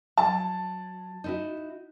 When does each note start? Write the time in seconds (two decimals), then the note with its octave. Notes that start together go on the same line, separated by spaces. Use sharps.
0.17 F#3 A5
1.24 D#4 E4 F#4